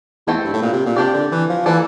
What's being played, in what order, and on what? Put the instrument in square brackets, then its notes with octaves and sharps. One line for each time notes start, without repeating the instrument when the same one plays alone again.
[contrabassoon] E2 [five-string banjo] A3 C4 E4
[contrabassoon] G2
A2
A#2
C3
A#2
[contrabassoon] C3 [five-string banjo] D4 G4 D5
[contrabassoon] D3
E3
F3
[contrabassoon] E3 [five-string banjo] A#3 E4 A4 D5